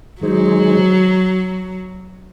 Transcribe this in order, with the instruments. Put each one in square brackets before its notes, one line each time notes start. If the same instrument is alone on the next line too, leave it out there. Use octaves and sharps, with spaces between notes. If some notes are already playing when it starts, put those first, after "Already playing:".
[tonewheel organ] D#3 G#3 D#4 G#4 C5 [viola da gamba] F#3